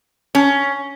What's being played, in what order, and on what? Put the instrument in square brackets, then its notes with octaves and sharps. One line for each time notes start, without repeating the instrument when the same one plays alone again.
[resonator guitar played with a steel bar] C#4